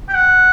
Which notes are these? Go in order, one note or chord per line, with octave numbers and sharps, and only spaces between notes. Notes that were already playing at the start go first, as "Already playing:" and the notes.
G5
F#5